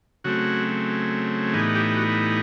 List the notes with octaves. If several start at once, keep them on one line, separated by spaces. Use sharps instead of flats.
C#3 F#3 A3 C4 F#4
A2 E3 G3 B3 D#4 G#4
G4
F#4